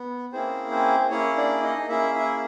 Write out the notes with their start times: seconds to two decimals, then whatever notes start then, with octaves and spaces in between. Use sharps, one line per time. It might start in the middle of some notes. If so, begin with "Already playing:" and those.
Already playing: B3
0.32 A#3 C4 C#4 E4 G#4 C5
0.71 C4 C5
1.10 A#3 C#4 E4 G#4 C#5
1.36 D4 D5
1.62 D#4 D#5
1.89 A#3 C#4 E4 G#4 E5
2.14 E4 E5